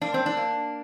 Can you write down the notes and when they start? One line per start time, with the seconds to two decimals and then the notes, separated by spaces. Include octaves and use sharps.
0.01 A#3 D4
0.14 C4
0.26 D4
0.37 A#3